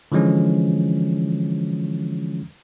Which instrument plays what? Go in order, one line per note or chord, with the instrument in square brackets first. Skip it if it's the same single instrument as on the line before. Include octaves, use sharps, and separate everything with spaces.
[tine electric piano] D3 E3 F3 G#3 C#4